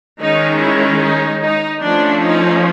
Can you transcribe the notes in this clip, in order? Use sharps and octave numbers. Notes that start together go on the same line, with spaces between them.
D#3 G#3 C#4 D#4
E4
D#4
D#4
F3 A3 C#4 D4
D#4